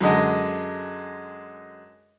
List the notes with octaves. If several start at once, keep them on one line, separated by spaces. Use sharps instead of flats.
F#2 D3 G#3 D#5